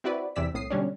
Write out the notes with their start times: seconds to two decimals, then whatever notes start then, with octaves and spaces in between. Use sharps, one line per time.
0.04 C4 E4 F#4 B4 D5
0.36 E2 C3 E3 D5 E6 B6
0.54 C2 A2 D#6 C7
0.70 B2 D3 G3 C#4 D4